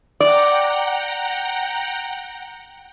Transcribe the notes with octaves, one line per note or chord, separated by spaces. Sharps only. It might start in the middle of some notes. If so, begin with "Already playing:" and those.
D5 F#5 G5 A#5